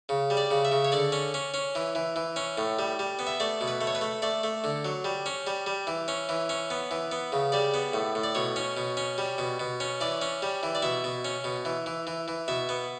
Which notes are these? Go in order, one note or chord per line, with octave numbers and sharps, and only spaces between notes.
C#3
G3
D5
C#3
E5
C#3
C#5
D3 D5
C#4
C#4
C#4
E3
E3
E3
C#4
A2
G3
G3
B3
E5
A3 D5
B2
B4
A3
C#5
B4
A3
A3 D5
A3
D3
F#3
G3
C#4
G3
G3
E3
C#4
E3
C#4
B3
E3
B3
C#3
G3 D5
B3
A2
A2
D5
B2 C#5
C#4
B2
C#4
G3
B2
B2
C#4
E3 D5
C#4
G3
E3
D5
B2 E5
B2
C#4
B2
E3
E3
E3
E3
B2 E5
B3